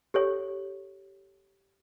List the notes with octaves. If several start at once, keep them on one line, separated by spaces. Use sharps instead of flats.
G4 A4 C#5